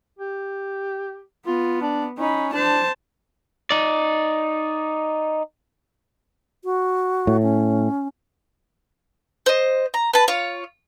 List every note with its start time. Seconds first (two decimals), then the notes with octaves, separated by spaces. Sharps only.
0.19 G4
1.47 B3 F4
1.82 D4
2.18 C#4 D#4 B5
2.53 D4 C5 A5
3.70 D#4 D5
6.64 F#4
7.27 A2
7.42 C#4
9.46 C5 D#5
9.94 A#5
10.13 B4 A5
10.28 F4 C#5